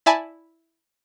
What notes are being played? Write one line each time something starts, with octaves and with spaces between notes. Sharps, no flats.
E4 D5 E5 G#5 A5 B5